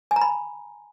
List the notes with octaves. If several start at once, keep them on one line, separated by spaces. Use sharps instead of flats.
G#5
A#5
B5